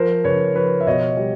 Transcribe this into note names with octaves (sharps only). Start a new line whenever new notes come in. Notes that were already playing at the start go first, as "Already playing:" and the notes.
Already playing: F3 A#4 C5
C#3 B4 C#5
F3 B4 C#5
E5
B2 C#5 D#5
G3